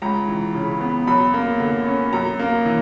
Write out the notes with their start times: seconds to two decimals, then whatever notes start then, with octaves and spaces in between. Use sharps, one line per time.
0.02 C#2 A#5
0.28 E3
0.54 C#3
0.81 B3
1.07 F#2 B5
1.34 A#3
1.60 D3
1.87 C#4
2.13 F#2 A#5
2.39 A#3
2.66 E3